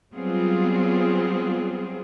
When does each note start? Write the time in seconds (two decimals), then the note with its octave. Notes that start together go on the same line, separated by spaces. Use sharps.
0.13 F#3 G3 B3 C4 F4 G#4